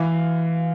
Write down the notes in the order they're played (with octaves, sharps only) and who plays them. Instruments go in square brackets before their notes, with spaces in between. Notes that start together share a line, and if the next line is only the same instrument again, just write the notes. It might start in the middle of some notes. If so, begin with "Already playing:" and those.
Already playing: [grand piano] E3 F5